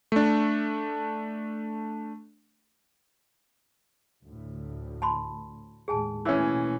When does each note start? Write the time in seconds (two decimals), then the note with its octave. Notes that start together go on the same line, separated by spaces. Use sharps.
0.12 A3 D4
4.23 D2 A2
5.02 A5 B5 C6
5.88 D#2 A2 G#3 G#4 G#5 A5
6.25 B2 E3 A3 A#3 C#4 C#5 E5 E6